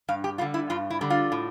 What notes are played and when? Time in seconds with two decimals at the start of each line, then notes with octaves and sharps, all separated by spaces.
0.08 G2 F5
0.24 G4
0.38 D3 G3 F4
0.54 E4
0.70 G2 F4
0.90 E4
1.01 D3 G3
1.10 F4
1.32 A2